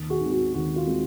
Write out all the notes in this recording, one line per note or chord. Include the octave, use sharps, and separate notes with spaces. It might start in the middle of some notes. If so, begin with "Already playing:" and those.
Already playing: D#2
F#4 G#4
D#3 G#3 C4
F#4
D#2 F#4
F4
D#3 G#3 C4